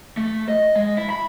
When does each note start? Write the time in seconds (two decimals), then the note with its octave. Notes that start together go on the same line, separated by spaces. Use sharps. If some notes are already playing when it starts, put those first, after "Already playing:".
0.17 A3
0.48 D#5
0.76 G#3
0.97 E4
1.10 B5